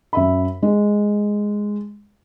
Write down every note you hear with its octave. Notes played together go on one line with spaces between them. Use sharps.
F#2 E5 B5
G#3